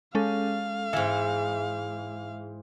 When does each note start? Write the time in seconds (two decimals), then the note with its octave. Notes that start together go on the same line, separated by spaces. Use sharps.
0.15 G#3 C#4 A4 F5
0.93 G#2 E3 E5